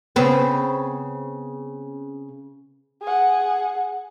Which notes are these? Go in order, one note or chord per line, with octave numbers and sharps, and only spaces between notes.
C#3 B3 C4
G#4 F#5